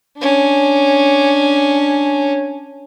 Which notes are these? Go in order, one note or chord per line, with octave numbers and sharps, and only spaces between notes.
C#4 D4